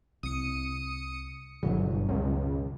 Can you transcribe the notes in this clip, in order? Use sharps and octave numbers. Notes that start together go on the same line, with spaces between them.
C2 D#6 C#7
G1 B2 D#3 F#3
C#2